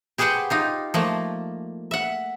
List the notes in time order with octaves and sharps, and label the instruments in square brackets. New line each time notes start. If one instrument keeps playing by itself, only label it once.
[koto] G4 G#4 B4 C5 F#5 G5
D#4 F4 G4
F3 A3 A#3
E5 F#5